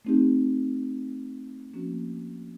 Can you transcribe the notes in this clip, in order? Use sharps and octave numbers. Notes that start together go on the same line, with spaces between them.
A3 C4 D#4 G4
F3 A#3 C#4 F#4